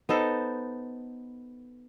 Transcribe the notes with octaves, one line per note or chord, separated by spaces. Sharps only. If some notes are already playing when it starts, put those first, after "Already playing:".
B3 D#4 A4 C5